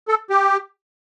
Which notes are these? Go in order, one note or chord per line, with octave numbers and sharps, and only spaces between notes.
A4
G4